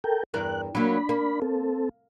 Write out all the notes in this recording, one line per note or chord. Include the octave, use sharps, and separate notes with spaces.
A4 A#4 G5
E2 G2 A#4 F#6
F#3 A#3 D4 B5
A#3
C4 A4